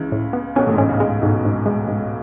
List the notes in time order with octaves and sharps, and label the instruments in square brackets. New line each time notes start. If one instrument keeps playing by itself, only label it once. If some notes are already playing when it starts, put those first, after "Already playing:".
Already playing: [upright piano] C#2 C#3 [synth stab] E3
[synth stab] A2
B3
[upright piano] B1 B2 [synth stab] C#4
[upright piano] A1 A2
G#2
[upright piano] A1 A2 [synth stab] C#4
[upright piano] C#2 C#3
[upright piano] C#2 C#3 [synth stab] G#3
[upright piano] B1 B2 [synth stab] G#2
[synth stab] G#2
G#3
G#2